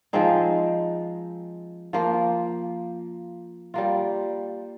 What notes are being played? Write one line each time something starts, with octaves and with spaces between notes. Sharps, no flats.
F3 G#3 C4 D#4
F3 A#3 F4
G3 A#3 F4